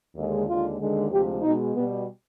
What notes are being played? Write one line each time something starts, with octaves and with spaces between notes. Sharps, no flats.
D#2 D3 G#3
D#2 D3 G#3 F4
D#2 D3 G#3
D2 C3 F3 G#3 G4
B2 G#3 D#4
B2 G3 B3